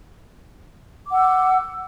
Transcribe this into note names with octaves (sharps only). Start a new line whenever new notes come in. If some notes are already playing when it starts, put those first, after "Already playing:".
F#5 D6 E6